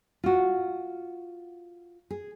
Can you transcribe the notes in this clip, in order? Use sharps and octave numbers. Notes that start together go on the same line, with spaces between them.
F4 F#4
G#4